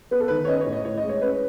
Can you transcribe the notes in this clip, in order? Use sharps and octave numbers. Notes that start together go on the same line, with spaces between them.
B3 B4
A4
D#3 B4
C#5
C#4 D#5
C#5
A2
D#5
A2 C#5
D#5
G#3
C#5
C#4 B4